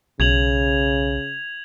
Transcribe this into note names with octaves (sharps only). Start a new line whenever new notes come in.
B1 C#3 G#6 F7 F#7